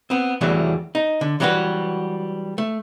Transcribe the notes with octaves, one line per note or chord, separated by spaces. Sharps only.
B3 C4
E2 E3 F#3 G3 A3
D#4
D3
E3 F#3 G3 E4 F#4 B4
A3